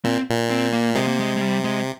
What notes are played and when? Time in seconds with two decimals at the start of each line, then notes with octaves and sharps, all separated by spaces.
0.04 A#2 C4
0.29 A#2
0.50 C4
0.73 A#3
0.95 C3 G#3
1.08 A#3
1.20 G#3
1.36 G#3
1.41 G3
1.64 G#3